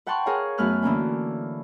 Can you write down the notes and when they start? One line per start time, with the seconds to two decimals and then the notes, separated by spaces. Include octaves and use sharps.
0.06 B4 F#5 G5 A5 C6 C#6
0.26 G#4 A#4 C#5 F5
0.58 F#2 A3 B3 B4 F6 F#6
0.83 D3 E3 A#3 C#4